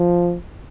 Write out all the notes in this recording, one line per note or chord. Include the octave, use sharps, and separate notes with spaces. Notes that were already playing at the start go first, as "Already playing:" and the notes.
Already playing: F3